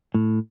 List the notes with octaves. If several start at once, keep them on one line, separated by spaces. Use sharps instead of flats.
A2